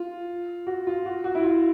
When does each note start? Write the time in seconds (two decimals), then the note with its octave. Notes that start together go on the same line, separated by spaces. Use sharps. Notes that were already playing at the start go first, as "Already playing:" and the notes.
Already playing: F4
0.67 F#4
0.87 F4
1.06 F#4
1.24 F#4
1.35 E4
1.44 F4